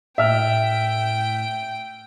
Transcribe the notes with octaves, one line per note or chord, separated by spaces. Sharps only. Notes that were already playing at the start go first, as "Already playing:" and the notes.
A2 E5 G5 F6